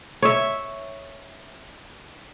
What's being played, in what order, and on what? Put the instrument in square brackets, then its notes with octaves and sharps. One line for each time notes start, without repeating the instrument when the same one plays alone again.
[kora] C#5 E5